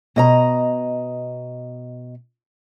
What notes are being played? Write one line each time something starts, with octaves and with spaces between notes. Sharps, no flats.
B2 D#5 A#5